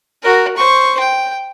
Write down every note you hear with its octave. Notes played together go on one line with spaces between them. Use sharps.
F#4 A#4
C5 C#6
G5